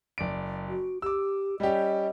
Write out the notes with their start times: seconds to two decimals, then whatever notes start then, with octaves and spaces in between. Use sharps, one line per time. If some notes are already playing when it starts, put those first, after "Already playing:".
0.18 F#1 D5 D7
0.68 F#4
1.02 G4 D6 E6
1.60 G3 C#4 G4 D#5